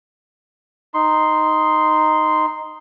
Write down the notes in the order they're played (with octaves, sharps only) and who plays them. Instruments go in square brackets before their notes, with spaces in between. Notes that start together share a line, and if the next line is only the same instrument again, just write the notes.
[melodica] D#4 C6